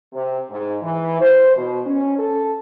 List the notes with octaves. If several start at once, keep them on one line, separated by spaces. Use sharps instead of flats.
C3
G#2
E3
C5
B2
C#4
A4